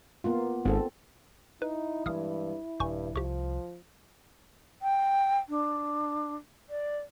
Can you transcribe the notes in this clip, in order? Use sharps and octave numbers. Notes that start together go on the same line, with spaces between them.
A#3 B3 F4
G#1 G#2 C4 A4
D#4 E4 B4
G2 E3 F3 G#3 F5 D#6 F6
D#1 G2 G#5 C#6 G6
C2 F3 G4 C#6
G5
D4
D5